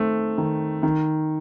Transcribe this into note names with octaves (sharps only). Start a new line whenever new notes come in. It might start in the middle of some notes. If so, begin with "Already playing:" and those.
Already playing: D#3 A3 C4
D#3
D#3